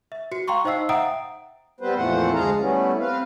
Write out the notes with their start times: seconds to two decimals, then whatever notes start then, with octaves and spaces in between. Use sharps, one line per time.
0.12 E5
0.32 F#4 C#7
0.48 F5 G5 A#5 C6 C#6
0.65 D#4 C5 D#5 F5 E6 C7
0.89 E5 F#5 G5 A#5 D#6 D7
1.81 G3 B3 C4 B4 C5
1.96 F2 A#2 E3 A3 C5 F#5
2.34 D2 G#3 G#4 F5 A5 A#5
2.59 G3 A3 B3 C#4 E4
2.99 C4 B4 F5